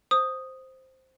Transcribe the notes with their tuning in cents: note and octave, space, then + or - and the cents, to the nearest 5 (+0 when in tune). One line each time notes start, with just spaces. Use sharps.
C5 +0 D#6 +0